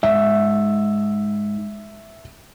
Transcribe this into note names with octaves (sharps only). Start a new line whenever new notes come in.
G#2 E5